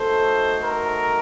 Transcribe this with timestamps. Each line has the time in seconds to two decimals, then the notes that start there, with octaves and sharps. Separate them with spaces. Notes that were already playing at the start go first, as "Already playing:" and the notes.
Already playing: A3 D#4 F#4 A4 C5
0.64 A#4